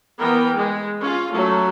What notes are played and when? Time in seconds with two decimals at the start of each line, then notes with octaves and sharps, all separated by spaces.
0.18 E3 B3 A#4 G5
0.55 G#3
0.99 C#4 F4
1.32 F#3 A3 C#4